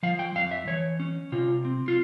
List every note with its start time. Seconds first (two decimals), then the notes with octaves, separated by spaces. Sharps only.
0.03 F3 F5
0.19 G5
0.35 F2 F5
0.51 E5
0.67 E3 C#5
1.00 C#4
1.32 C3 F4
1.65 C4
1.88 F4